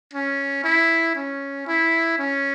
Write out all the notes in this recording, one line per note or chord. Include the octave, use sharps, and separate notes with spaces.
C#4
E4
C#4
E4
C#4